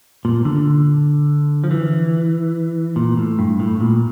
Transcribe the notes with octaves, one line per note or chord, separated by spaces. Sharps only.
A#2
D3
F3
E3
A#2
A2
G2
A2
A#2